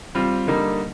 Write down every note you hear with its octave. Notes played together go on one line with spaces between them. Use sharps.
G3 C4 F4
D3 G3 A#3 D#4